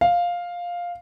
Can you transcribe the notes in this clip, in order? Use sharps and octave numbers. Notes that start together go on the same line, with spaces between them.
F5